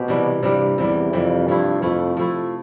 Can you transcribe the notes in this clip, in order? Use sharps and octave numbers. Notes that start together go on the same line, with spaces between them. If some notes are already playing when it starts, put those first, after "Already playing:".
Already playing: B2 C4 G4
C3 E3 G3
G2 C3 E3 G3
E2 C3 E3 G3
F2 C3 E3 G3
G2 F3 A3 E4
F2 F3 A3 E4
F3 A3 E4